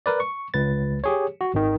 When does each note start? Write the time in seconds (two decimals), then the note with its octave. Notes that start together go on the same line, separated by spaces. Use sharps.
0.06 A#4 B4 D5
0.20 C#6
0.54 C#2 B4 A6
1.04 G4 G#4 C#5
1.41 F#4
1.54 G#1 D#3